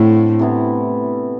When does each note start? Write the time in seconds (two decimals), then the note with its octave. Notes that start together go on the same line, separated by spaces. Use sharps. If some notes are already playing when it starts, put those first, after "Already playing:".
Already playing: A2 D3 A3 C4
0.39 C3 E3 B3 E4